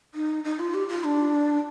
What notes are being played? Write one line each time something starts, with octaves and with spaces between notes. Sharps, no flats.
D#4
D#4
F4
G4
F4
D4